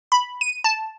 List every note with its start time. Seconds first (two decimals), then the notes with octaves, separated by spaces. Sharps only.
0.12 B5
0.41 D#7
0.64 A5